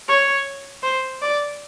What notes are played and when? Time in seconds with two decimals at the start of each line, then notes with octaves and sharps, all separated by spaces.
0.08 C#5
0.83 C5
1.22 D5